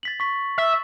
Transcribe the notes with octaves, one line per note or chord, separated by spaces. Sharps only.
A6 B6 F#7
C#6 B6
E5